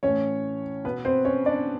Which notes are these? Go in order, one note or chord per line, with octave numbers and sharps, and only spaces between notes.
A2 E3 C#4 C#5
B2 B3 B4
C4 C5
C#4 C#5
D4 D5